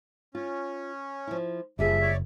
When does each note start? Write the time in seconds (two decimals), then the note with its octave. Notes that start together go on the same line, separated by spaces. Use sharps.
0.35 C#4 F4
1.27 F3 E4
1.79 F#1 F3 G3 F4 G#4 E5
2.02 C#5 D5